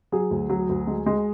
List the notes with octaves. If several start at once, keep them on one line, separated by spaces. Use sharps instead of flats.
F#3 G#4
D2
F#3
D2
G#3
G#3